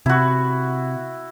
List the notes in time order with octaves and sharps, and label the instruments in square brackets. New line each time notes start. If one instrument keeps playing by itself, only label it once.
[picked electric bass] C3 [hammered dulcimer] E4 F#4